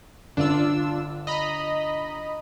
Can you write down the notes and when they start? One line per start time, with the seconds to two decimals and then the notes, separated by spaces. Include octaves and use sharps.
0.37 G1 D4 F4 E6
1.27 D#5 A#5 B5